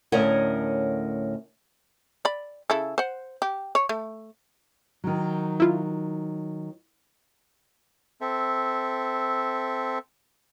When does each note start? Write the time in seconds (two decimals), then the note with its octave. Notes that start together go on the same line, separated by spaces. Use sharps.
0.12 D2 A2 C#4 A#4 D#5 F#5
2.25 D5 B5
2.70 C#3 E4 A4
2.98 C5 F#5
3.42 G4
3.75 C#5
3.89 A3
5.04 D#3 F#3
5.60 E4 F4
8.21 C4 A4 E5